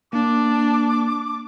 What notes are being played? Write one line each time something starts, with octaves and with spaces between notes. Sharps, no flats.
A#3 D4 D6